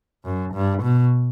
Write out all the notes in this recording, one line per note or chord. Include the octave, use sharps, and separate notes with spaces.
F#2
G2
B2